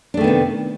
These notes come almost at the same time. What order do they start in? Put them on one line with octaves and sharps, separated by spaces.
D4 A3 D#3 B3 C3